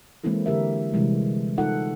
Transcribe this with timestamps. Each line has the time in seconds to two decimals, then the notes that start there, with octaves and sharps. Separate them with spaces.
0.24 E3 G#3 A#3 C4 E4 A4
0.46 D3 G4 A#4 E5
0.94 C3 E3 G3 G#3
1.58 D#4 F4 A4 F#5